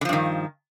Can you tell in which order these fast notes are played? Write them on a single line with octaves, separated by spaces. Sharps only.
D3 F3 G2 D#3